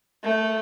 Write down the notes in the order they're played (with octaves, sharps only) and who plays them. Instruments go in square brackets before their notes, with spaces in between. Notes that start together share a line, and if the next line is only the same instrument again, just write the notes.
[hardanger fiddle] A3